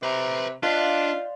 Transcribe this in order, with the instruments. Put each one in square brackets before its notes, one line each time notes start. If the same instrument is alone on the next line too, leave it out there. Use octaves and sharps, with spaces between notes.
[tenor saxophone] C3 [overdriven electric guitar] B4 A#5
[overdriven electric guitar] D4 [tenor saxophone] F4 [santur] C5 D5 F5 [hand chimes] D#5 F#6 B6